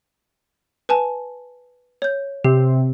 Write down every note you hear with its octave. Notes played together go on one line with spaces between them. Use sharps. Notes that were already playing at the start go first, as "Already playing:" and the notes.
B4 G#5 A5
C#5 G6
C3 G4